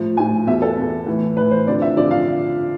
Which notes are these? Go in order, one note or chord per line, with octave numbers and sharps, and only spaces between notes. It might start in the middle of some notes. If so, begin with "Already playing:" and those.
Already playing: A2 F3
A2 F3 G#5
E2 B2 E5
A4
E2 B2
A2 E3
A2 E3 B4
C5
F2 D3 F3 D5
E5
F2 D3 F3 D5
F5